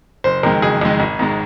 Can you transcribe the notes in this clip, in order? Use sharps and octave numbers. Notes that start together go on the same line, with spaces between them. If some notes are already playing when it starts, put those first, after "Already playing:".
F#1 C5
F2 D#3 G#3 A#4
F#1 G#4
F2 D#3 G#3
G#1
G#2 D#3 G#3